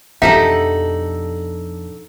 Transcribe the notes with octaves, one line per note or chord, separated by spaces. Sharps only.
F2 B2 D4 D#4 G4 A4 E5 F#5